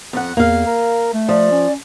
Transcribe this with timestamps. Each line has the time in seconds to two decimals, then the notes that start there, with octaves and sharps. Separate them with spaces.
0.13 F2 F#5
0.37 E2 A#3 F5
0.66 A#4
1.13 A3
1.29 F3 D5
1.52 C#4